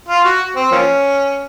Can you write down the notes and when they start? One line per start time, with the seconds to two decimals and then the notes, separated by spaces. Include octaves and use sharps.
0.08 F4
0.24 F#4
0.56 C4
0.71 F3 A#3 C#4